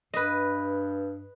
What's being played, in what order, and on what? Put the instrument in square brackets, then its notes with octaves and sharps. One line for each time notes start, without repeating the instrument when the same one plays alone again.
[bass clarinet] G2 [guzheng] B4 D#5